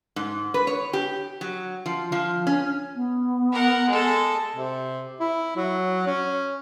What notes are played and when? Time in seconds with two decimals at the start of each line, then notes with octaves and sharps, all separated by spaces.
0.16 G#2
0.54 B4
0.67 C#5
0.93 G4
1.41 F#3
1.86 F3
2.12 F3
2.47 C#4
2.95 B3
3.52 A#4 F#5
3.88 G#3 A4
4.56 C3
5.20 E4
5.57 F#3
6.07 C#4